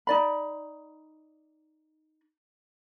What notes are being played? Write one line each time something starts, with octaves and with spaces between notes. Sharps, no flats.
D#4 D5 B5